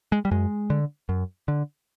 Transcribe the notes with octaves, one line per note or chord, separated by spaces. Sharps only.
G#3
G3
F#2 G#3
D3
F#2
D3